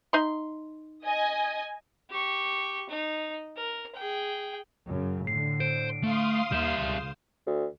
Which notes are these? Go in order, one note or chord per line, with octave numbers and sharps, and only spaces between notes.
D#4 C6
D#5 G#5
G4 C#6
D#4
A#4
G#4 G5
F#2 C#3
A2 D3 C7
C5 D7
A3 F5 C6 D#6
D#2 G3 E5 G6 E7
C#2 C#3
D2